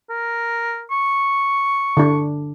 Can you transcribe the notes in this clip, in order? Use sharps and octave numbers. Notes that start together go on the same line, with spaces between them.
A#4
C#6
D3 D4